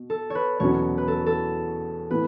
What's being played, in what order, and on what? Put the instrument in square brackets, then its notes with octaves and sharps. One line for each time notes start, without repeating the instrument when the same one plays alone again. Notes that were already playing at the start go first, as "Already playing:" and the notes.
Already playing: [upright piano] B2
[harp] A4
B4 C#5
[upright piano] E2 B2 F#3 C#4 [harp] C#5
[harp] B4
A4
A4
[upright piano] A2 E3 B3 E4 [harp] B4